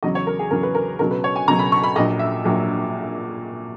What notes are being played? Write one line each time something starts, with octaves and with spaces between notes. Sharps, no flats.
E2 C#3 F#3 D#5
C#5
A#4
G#4
E2 C#3 F#3 A#4
B4
A#4
C#2 B2 F#3 A#4
B4
C#5
G#5
C#2 B2 F#3 A#5
B5
C#6
B5
A#1 A#2 F#3 D#5
E5
A#1 A#2 F#3